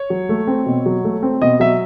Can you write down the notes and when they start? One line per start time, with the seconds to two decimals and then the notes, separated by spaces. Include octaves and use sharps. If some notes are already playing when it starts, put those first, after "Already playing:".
Already playing: C#5
0.10 F#3
0.29 A3
0.47 C4
0.66 B2
0.86 F#3
1.04 A3
1.23 C4
1.42 B2 D#5
1.60 F#3 E5